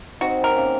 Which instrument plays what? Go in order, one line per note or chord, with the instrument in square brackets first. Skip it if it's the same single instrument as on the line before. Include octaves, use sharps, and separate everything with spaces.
[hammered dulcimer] C4 D#4 [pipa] F#4
[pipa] A#4
[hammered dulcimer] A#3 C#4